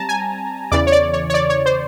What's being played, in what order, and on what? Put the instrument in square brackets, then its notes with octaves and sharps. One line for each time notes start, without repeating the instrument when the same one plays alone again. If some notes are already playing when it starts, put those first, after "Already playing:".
Already playing: [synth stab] G3 C4 A5 A#5
G#5
E2 C#3 E3 D5
C#5
D5
C#5
C#5
D5
C#5
C5